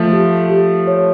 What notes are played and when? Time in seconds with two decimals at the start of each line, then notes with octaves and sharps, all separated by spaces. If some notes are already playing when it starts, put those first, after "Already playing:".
Already playing: F3 A3 E5
0.12 G4
0.50 G4
0.87 C#5